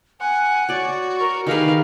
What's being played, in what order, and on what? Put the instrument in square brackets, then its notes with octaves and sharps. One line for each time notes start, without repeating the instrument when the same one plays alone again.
[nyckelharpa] F#5 [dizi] G#5
[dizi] F#4 [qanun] C#5 D5
[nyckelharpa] A#4 C#6
[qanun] D#3 G4 B4 [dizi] G#4 [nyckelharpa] A#4 F5